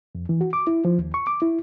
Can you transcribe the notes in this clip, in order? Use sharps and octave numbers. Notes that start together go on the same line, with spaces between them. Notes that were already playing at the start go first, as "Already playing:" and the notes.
F2
E3
F#4
D6
E4
F3
D#2
C#6
D6
E4